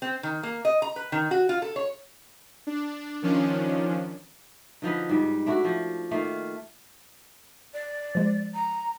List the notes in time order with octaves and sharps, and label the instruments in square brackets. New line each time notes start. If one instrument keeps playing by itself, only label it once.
[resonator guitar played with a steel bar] C4
D#3
A#3
D#5
A#5
B4
D#3
F#4
F4
A4
C#5
[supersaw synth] D4
D#3 F3 C#4 D4
[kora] D3 F3 D#4 B4
G#2 G3
A3 D4 E4 F#4
F3
D#3 A3 A#3 F4
[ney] D5
[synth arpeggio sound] F3 G#3 C5
[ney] A#5